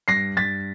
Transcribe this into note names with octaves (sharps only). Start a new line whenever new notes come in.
G2 A#6 C7
G2 A6 B6